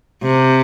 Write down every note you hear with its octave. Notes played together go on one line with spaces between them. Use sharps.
C3